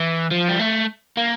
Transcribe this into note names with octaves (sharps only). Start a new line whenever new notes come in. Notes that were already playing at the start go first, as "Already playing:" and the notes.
Already playing: E3
F3
G3
A3
A#3